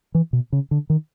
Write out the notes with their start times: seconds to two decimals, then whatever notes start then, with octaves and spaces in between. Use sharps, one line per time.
0.15 E3
0.33 B2
0.53 C#3
0.71 D3
0.90 D#3